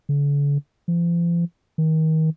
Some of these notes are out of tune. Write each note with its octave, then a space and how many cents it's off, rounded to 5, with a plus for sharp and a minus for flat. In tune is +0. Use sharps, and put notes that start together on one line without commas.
D3 -45
F3 -40
D#3 +30